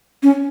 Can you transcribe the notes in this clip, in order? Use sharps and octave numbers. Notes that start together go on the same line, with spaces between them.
C#4